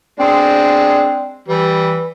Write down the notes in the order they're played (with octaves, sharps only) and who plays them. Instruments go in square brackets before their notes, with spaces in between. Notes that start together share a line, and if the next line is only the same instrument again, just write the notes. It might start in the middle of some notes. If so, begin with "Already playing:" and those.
[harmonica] G#3 D4 [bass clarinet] C4
[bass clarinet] E3 [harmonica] G3